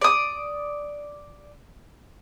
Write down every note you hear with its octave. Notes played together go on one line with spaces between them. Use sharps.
D5 D#6